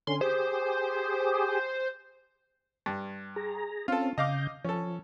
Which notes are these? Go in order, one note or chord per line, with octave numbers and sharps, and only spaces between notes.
D3 C#4 C6
G4 G#4 C5
G2
G#4 A#5
C4 C#4 F4 A4
C#3 D#5 F5 D6 G6
F3 C#4 A4